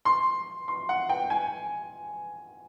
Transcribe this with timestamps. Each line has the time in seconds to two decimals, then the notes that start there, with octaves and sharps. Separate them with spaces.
0.05 C6
0.68 C6
0.89 F#5
1.09 G5
1.30 G#5